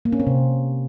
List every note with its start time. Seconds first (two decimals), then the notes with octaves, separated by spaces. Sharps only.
0.05 A#3
0.12 C#4
0.20 C4
0.27 C3